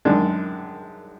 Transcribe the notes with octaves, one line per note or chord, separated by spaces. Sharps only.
F#2 D#3 G#3 D4